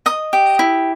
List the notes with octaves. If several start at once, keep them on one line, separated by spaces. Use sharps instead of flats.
D#5 D#6
G4
E4